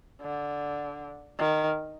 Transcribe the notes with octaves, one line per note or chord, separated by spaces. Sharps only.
D3
D#3